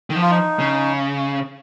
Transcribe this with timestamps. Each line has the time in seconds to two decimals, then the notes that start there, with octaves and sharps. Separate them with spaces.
0.10 D#3
0.16 F3
0.22 F4
0.31 D#4
0.59 C#3